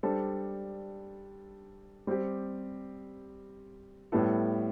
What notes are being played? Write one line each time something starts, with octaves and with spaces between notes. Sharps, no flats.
G3 D4 A4 C5
G3 C4 G4
A2 G3 B3 E4 A4